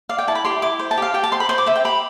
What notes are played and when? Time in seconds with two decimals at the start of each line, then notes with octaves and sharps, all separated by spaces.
0.09 D5 F5
0.18 G5
0.28 E4 A5
0.35 B5
0.45 G4 C6
0.62 E4 D6
0.79 C5
0.91 A5
0.98 G4 F5
1.14 G4 G5
1.24 A5
1.32 C5 C6
1.40 B5
1.49 C5 C6
1.58 D6
1.66 C5 E5
1.75 G5
1.84 G4 B5